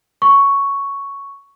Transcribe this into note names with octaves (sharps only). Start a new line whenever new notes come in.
C#6